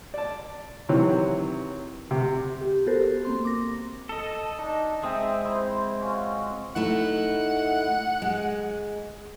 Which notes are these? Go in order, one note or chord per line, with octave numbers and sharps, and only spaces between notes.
D5 A5
C3 D#3 E3 F#3 C4
C3
G4
B3 F#4 G4 A4 A#4 C5
A#3 C4 C6
D6 A#6
A4 D#5
D4 D#4 D#5 A5
G#3 C4 E5 G5 D#6
E4 C5
C#4 F4 F#4
A3 D#4 E4 F#5
G#3